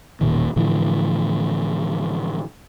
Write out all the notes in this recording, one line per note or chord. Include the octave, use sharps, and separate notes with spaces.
E1 A#2 D#3
A2 D3 E3 F3